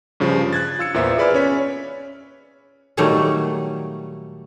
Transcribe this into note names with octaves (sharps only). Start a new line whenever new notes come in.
G2 C#3 F3
F#6 G#6 A6
F4 E6 C#7
E2 A#2 B3 C5 E5
G#4 B4 D5 B5 F6
C#4 C#5 B6
A#2 D#3 F#3 G3 A3 D#4